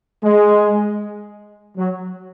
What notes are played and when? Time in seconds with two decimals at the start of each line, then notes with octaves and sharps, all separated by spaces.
0.24 G#3
1.77 F#3